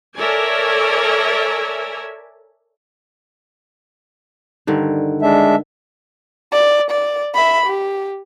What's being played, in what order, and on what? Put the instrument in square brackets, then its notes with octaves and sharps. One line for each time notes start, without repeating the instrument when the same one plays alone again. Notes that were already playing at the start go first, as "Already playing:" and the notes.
[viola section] A4 A#4 C#5 D5 E5 G#5
[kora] G2 D3 D#3
[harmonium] G#3 D4 E5
[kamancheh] D5
D5
E5 B5
G4